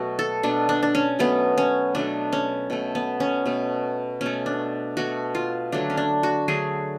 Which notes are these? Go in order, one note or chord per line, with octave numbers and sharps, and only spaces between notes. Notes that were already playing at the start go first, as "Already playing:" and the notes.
Already playing: B2 F#3 A3 F#4
A4
B2 F#3 A3 D4
D4
D4
C#4
B2 F#3 A3 B3
C#4
B2 F#3 A3 D4
C#4
B2 A3
B3
C#4
B2 A3
B2 A3 C#4
D4
B2 A3 F#4
F4
D3 F#3 A3 D4
C#4
D4
F#4
D3 F#3 A3 G#4